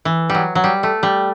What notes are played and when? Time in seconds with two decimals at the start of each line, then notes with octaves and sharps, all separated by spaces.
0.05 E3
0.30 G3
0.35 F#3
0.55 F#3
0.64 G3
0.83 A3
1.03 G3